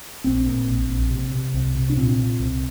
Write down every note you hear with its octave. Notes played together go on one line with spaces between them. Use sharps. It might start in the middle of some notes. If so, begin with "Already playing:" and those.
A#1 C4
A#2
A#1
A#1
C3
C3
C2
C3
D4
A#2 C4
A#2
C2